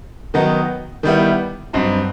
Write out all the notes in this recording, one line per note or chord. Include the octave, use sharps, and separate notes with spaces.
D#3 F#3 B3 D#4
D#3 G3 B3 E4
G2 F#3 C4 D#4